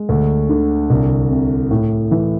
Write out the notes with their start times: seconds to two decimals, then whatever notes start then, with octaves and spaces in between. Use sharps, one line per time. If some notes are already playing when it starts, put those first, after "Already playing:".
Already playing: G#3
0.09 D2
0.49 D3
0.90 C2
1.30 C3
1.71 A2
2.11 E3